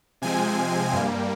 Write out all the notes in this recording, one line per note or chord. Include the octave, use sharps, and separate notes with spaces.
C3 F3 G#3 C4 G#5
G2 G3 A#3